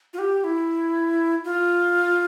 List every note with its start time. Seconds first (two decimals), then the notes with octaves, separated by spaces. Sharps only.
0.13 F4
0.19 G4
0.44 E4
1.45 F4